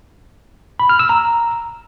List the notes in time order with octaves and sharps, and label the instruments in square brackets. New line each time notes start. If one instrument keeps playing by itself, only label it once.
[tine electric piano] B5
F6
E6
A#5